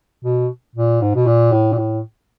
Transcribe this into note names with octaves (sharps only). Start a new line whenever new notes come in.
B2
A#2
G#2
B2
A#2
A2
A#2
A2